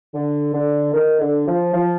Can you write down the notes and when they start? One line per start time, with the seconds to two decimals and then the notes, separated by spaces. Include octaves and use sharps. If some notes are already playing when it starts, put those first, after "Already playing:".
0.14 D3
0.54 D3
0.93 D#3
1.20 D3
1.47 F3
1.74 F3